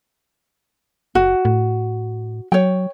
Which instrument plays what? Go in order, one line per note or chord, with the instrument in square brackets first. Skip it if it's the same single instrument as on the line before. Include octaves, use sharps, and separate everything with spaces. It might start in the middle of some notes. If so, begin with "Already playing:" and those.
[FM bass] F#1 [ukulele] F#4
[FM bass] A2
[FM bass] F#3 [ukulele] C#5 G5